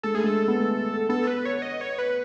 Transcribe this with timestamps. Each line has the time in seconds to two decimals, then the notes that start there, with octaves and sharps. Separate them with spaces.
0.03 G#3 A4
0.14 A3 G#4
0.24 G#3 A4
0.48 B3
0.57 A3
1.09 B3 A4
1.27 B4
1.45 C#5
1.62 D#5
1.81 C#5
1.99 B4